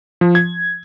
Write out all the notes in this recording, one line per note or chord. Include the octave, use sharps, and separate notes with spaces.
F3
G#6